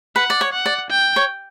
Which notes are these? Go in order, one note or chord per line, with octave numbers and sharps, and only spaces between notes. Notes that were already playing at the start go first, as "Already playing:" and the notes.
B4 F#5
D5
C#5
F#5
D5
G5
C#5